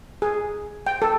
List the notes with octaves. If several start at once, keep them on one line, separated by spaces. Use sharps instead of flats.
G#4
G5
A4